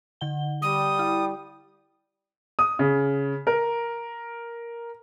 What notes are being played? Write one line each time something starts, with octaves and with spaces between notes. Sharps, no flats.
D3 F#5 G7
G3 D#6
E4
D#6
C#3
A#4